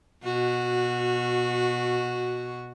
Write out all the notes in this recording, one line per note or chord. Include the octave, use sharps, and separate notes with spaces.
B2 F#4